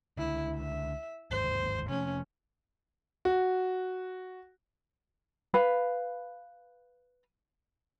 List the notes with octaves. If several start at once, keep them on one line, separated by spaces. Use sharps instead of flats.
C#2 D3 E4
E5
G1 D#2 G#2 C5
C3 F3 A3 C#4
F#4
B4 F5 B5